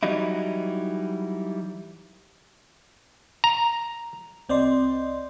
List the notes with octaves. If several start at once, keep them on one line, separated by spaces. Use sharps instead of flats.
E3 F#3 G3 D#4 E4
A#5
C2 C4 D5 D#5 C6